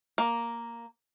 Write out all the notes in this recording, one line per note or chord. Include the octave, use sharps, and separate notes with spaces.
A#3